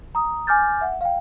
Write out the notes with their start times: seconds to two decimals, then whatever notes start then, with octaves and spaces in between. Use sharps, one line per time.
0.15 A#5 D#6
0.47 G#5 D6 F6 G6 A6
0.81 E5 F#5
1.01 F5 G5